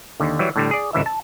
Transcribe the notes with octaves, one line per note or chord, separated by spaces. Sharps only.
D#2 D3
E3 F#3 G3
A2 D3 G3
G#4 D5
G#1 C#2 E3 E5
A5